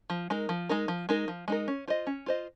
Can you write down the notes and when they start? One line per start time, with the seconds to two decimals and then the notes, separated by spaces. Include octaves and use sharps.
0.10 F3
0.30 G#3 D#4 A#4
0.49 F3
0.69 G#3 D#4 A#4
0.88 F3
1.09 G#3 D#4 A#4
1.28 F3
1.48 G#3 D#4 A#4
1.68 C#4
1.88 F4 C5 D#5
2.07 C#4
2.26 F4 C5 D#5